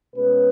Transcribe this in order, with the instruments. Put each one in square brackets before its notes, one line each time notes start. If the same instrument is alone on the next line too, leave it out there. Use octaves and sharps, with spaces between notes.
[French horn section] B2 G#3 C#4 B4